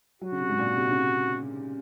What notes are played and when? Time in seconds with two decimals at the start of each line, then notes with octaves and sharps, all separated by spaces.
0.21 F#3 F#4
0.32 C#3
0.41 C3
0.49 G#2
0.59 A#2
0.77 C3
0.91 C#3